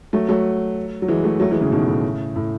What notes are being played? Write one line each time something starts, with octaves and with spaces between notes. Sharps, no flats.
F#3 A3
F#3 A3
F#3
E3 G#3
F#3 A3
F#3 A3
E3 G#3
C#3 E3
B2 D#3
A2 C#3
A2